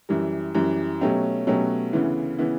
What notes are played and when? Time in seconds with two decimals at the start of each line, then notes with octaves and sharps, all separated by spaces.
0.09 F#2 E3 G3
0.55 F#2 E3 G3
1.01 B2 F#3 A3 C#4 G4
1.47 B2 F#3 A3 C#4 G4
1.93 D2 C#3 E3 B3 E4
2.39 C#3 E3 B3 E4